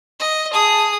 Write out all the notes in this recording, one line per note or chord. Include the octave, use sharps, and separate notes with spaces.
D#5
G#4 A5 D#6